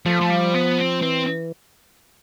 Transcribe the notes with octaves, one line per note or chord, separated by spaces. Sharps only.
F3 A3
A3
G3
B3
C4
E3 C4